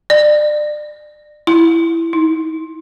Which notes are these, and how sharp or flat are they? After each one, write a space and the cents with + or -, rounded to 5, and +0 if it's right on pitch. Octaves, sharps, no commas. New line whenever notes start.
D5 +30
E4 +10
D#4 +40